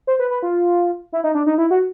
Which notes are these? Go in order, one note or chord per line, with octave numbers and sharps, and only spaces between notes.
C5
B4
B4
F4
E4
D#4
D4
D#4
E4
F#4